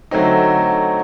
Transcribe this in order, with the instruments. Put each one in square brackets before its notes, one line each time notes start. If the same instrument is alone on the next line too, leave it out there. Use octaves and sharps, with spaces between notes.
[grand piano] D3 F#3 A3 C4 D#4